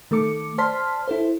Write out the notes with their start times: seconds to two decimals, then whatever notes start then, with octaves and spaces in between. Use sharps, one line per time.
0.11 D#3 A3 A4 D6 C#7
0.58 C5 D5 A5 C6 F6 B6
1.08 E4 A4 C5